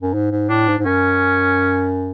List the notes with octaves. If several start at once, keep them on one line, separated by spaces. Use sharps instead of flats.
F#2
G#2
G#2
A2 D4
G#2
G#2
F#2 C#4